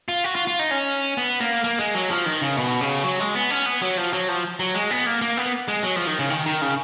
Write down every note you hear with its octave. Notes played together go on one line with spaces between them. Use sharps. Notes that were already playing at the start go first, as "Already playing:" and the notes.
F4
F#4
F4
F4
D#4
C#4
B3
A#3
A#3
G#3
F#3
F3
D#3
C#3
B2
C#3
F#3
G#3
B3
C#4
B3
F#3
F3
F#3
F3
F#3
G#3
B3
A#3
A#3
B3
G#3
F#3
F3
D#3
C#3
D#3
D#3
C#3